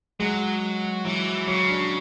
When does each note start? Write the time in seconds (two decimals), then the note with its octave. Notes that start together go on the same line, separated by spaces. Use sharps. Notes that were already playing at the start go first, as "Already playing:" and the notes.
0.20 F#3 G#3
1.05 E3 F#3
1.47 C#3 F#3
1.69 D4